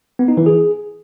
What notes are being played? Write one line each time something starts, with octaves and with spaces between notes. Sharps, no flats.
B3
D#4
E3
G#4